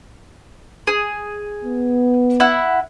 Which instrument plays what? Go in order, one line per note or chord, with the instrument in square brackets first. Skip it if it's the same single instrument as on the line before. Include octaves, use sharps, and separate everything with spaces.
[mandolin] G#4
[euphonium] B3
[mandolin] E4 F#5